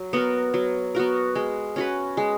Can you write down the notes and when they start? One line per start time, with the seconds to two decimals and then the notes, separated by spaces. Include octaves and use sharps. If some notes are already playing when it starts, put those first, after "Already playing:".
Already playing: F#3
0.13 B3 F#4 A#4
0.54 F#3
0.95 B3 F#4 A#4
1.35 G#3
1.76 C#4 F#4 B4
2.17 G#3